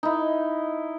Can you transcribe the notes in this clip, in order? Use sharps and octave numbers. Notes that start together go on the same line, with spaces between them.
D#4 E4